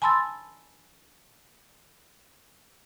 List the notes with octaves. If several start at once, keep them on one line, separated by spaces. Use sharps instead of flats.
G#5 A5 B5 C6 E6 A6